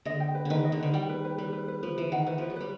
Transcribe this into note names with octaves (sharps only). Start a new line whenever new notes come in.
D3 D#5
G5
B4
D3 D#3 B4
D#5
D3
D#3 B4
G3 G5
B4
B4
G3 B4
B4
B4
F3 B4
E3 B4
D#3 F#5
E3 B4
F3 B4
F#3
G3 B4